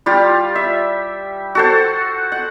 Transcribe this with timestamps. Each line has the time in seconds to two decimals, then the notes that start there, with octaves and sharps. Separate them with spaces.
0.06 G3 F4 G4
0.55 E5
1.55 F#4 A4 C5
2.32 F#5